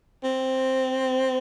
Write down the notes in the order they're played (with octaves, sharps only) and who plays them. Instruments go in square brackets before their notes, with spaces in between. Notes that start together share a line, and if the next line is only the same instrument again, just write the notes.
[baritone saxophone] C4